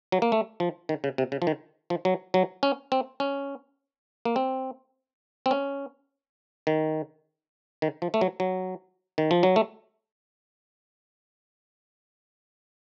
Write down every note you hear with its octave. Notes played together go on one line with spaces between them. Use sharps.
F#3
A#3
A3
F3
D#3
C#3
C3
C#3
F3
D#3
F3
F#3
F#3
C#4
C4
C#4
A#3
C4
C4
C#4
D#3
D#3
F3
A3
F#3
F#3
D#3
F3
F#3
A3